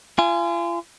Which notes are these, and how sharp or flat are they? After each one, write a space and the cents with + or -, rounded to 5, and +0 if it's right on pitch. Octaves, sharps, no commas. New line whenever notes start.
F4 -35 G#5 +0